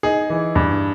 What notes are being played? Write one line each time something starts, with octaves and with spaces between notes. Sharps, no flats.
D#4 G#4
E3
G2